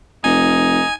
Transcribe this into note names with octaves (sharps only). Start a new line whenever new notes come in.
F1 D#4 G#5